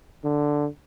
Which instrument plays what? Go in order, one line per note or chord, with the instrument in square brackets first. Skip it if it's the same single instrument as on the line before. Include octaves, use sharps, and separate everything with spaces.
[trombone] D3